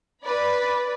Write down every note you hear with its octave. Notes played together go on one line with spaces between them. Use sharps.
B4 D5 B5